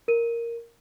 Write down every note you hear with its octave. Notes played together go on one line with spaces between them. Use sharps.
A#4 D#7